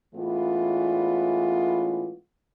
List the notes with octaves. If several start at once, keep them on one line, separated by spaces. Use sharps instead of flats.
A2 E3 G#3 B3 C#4 F4